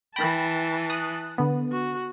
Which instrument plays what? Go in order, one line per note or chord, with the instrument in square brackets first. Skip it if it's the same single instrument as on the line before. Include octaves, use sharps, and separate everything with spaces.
[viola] E3 A5 [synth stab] G5 B5 A#6
[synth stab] D#6 F#6
D3 B3
[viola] F#4